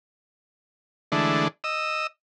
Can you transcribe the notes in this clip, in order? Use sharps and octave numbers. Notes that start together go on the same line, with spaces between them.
D3 E3 G#3 A3 D4
D#5 E6